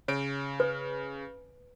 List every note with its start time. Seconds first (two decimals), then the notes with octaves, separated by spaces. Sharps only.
0.08 C#3 C#5 D7
0.60 B4